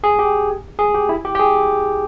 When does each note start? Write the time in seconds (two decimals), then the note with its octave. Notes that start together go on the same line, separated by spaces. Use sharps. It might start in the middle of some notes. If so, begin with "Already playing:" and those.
0.04 G#4
0.19 G4
0.79 G#4
0.94 G4
1.09 E4
1.25 G4
1.35 G4
1.40 G#4